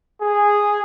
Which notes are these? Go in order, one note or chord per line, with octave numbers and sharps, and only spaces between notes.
G#4